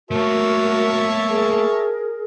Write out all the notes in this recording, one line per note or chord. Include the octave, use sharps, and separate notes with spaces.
A3 A#3 F#4 A#4 C#5 E5 A5
G#4 A#4